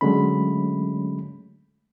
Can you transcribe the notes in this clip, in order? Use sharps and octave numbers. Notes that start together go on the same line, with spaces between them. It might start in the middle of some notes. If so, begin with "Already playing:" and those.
D3 F#3 G#3 A3 C#4 B5